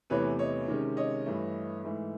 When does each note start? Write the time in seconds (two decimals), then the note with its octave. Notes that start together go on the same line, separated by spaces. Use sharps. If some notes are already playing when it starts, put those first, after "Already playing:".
0.10 E2 C3 E3 A3 B4 C#5
0.39 C#5 D#5
0.68 C3 D#3 G#3 C#4
0.97 C#5 D#5
1.26 G2 E3 A3
1.84 G#2 E3 A3